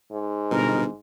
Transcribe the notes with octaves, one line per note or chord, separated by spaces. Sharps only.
G#2
G1 B2 A#4